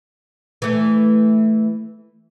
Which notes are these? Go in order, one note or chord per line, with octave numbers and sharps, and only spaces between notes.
E3 A3